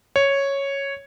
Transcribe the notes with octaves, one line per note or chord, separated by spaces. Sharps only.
C#5